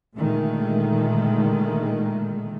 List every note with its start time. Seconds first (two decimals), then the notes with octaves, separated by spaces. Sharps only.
0.18 A#2 D3 D#3 G#3 A3